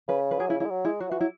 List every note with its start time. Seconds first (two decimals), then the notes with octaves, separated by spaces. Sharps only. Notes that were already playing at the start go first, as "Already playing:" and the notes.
0.08 C#3 B4
0.31 B4
0.39 F#3 G#4
0.50 C#3 E4
0.60 C#3 E4
0.65 G#3
0.70 F#3
0.85 G#3 E4
1.00 F#3 F#4
1.10 E3 F#4
1.20 F#3 E4